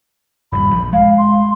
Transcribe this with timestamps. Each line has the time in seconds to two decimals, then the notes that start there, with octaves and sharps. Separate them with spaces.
0.52 D#1 G2 C3 B5
0.72 A#1 F3
0.93 G#3 F5
1.18 C6